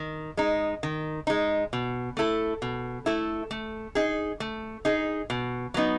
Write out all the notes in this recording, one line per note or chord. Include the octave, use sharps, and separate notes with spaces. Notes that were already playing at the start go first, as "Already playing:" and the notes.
Already playing: D#3
G#3 D#4
D#3
G#3 D#4
B2
A3 E4 A4
B2
A3 E4 A4
A3
D#4 G#4
A3
D#4 G#4
B2
F#3 B3 D#4